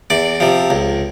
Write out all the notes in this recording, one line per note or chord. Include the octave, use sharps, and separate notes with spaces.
E2 D5
C3 F3
C#2